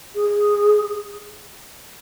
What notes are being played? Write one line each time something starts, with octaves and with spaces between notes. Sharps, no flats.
G#4